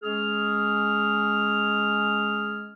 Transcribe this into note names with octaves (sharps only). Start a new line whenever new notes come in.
G#3 C#4 G#4 F6